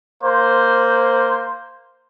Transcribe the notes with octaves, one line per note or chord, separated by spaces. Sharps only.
A#3 C5